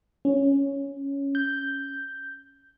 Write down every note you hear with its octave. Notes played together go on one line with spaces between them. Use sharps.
C#4
G6